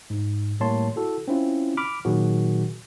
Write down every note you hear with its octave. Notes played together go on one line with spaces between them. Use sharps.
G#2
A2 G3 A#3 C#5 A5 C6
E4 F#4 A4
C4 C#4 E4 F4
B5 D6 F6
A#2 D#3 F#3 F#4 G#4